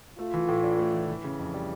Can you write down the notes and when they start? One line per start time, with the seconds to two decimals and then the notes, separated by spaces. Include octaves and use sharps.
0.18 A3 F4
0.34 E3
0.49 A2
0.64 D4
0.79 A3
0.94 E3
1.09 E3
1.24 C#3
1.39 F2
1.54 G3